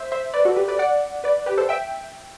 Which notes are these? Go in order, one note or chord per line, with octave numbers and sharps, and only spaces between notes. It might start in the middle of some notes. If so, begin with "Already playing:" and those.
Already playing: C5 E5
C5 E5
B4 D5
F#4 A4
G4 B4
B4 D5
D5 F#5
B4 D5
G4 B4
A4 C5
E5 G5